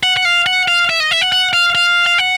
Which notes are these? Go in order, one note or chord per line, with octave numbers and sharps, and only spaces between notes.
F#5
F#5
F5
F#5
F5
E5
D#5
E5
F#5
F#5
F5
F5
F5
F#5